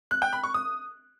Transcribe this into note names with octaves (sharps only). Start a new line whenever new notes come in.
F#6
G5
B5
C#6
D#6